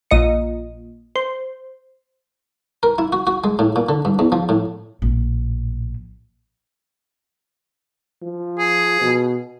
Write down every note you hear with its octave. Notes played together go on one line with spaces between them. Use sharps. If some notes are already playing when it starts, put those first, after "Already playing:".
A#1 D#5 C#7
C5
A#4
E4
F#4
F#4
G#3
A2
A#2
D3
G2
E2
F3
A2
A#1 A2
F3
G#4
B2